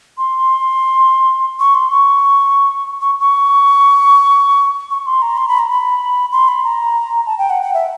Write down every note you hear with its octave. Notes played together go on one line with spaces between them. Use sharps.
C6
C#6
C6
C#6
C#6
C#6
C#6
C6
A#5
C6
B5
A#5
B5
C6
B5
A#5
A5
G5
F#5
F#5
E5